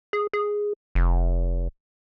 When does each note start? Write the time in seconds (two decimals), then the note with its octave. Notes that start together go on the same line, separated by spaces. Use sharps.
0.13 G#4
0.33 G#4
0.95 F1